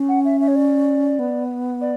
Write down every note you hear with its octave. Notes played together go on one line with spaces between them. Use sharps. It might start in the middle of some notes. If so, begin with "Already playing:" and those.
Already playing: C#4
F#5
E5
E5
C#5
D5
B3
D5